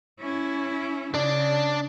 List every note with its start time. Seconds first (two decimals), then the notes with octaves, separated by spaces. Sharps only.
0.20 C#4 E4
1.14 C#3 D4 D5